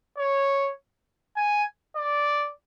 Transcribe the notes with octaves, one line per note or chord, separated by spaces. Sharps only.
C#5
G#5
D5